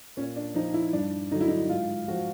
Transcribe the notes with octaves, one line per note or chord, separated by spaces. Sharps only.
A#2 C#4
D4
F3 D#4
E4
G2 D4
D3 F#3 D#4
E4
D#4
G#2 F4
F3 F#4